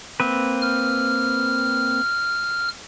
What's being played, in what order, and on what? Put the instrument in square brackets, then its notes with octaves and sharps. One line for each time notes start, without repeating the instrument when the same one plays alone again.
[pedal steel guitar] A#3 C4 B4
[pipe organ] F6